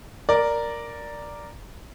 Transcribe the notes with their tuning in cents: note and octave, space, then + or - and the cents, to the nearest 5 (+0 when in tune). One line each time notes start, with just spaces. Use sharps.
A#4 +0 D5 +0